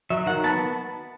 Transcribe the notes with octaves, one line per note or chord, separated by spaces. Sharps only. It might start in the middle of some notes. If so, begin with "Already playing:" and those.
F#3 E5
D#3 F#5
B3 A5